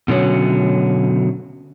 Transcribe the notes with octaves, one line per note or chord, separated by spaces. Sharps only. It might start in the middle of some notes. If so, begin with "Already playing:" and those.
B2 D3 F#3 C#4